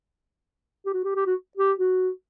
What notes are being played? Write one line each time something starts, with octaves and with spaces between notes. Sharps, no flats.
G4
F#4
G4
G4
F#4
G4
F#4